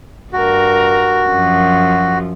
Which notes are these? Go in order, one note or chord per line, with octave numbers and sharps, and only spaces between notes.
G2 F#4 A#4
F#2 F3